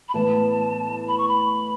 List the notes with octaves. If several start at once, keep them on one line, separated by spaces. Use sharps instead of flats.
B5
A2 E3 B3 A5
B5
C#6
B5